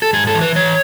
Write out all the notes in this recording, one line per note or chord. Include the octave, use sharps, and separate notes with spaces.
A4
G#2 G#4
A4
E3
B4
E3 C#5